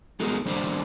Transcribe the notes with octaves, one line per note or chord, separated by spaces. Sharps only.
G#3 A3 B3 D#4 G#4 A#4
D#3 G3 A#3 D4 C5 D5